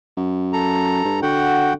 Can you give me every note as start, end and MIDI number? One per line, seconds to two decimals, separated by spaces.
0.18 1.02 42
0.53 1.20 69
0.53 1.20 82
1.05 1.19 43
1.22 1.73 50
1.22 1.73 66
1.22 1.73 78
1.22 1.73 79